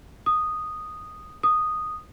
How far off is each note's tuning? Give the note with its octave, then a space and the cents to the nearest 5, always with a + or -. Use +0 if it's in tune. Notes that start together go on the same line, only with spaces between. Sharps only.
D#6 -5
D#6 -5